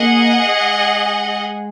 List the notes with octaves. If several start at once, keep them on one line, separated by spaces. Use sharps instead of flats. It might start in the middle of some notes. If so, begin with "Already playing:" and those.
Already playing: A#3 G#4 D#5 F#5
G#3